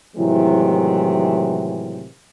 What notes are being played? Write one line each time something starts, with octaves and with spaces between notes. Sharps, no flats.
A2 C3 D#3 E3 F#3 G#3